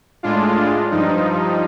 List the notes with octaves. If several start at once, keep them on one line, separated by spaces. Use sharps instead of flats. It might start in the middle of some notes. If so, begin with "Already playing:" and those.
A2 G#3 D4 F4
G2 F3 D#4